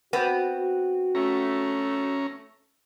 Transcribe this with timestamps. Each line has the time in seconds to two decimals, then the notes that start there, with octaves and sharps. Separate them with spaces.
0.13 B3 C4 F#4
1.15 A3 C#4 A#5